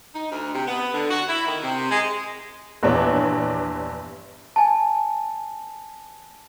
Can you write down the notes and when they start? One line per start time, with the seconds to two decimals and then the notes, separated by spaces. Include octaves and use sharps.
0.15 D#4
0.32 D2
0.54 C3
0.67 B3
0.94 D3
1.10 F#4
1.29 E4
1.46 D#3
1.63 C3
1.91 G#3
2.83 A#1 E2 G2 D4 C#5
4.56 G#5 A5